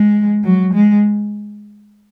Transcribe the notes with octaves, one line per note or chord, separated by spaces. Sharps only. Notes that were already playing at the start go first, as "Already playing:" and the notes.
Already playing: G#3
F#3
G#3